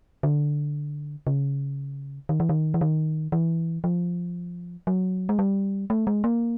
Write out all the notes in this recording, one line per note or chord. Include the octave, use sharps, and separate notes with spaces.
D3
C#3
D#3
E3
D#3
E3
D#3
E3
F3
F#3
G#3
G3
A3
G#3
A#3